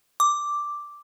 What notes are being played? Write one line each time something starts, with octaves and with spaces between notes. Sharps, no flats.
D6